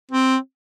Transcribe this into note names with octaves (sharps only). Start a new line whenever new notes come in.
C4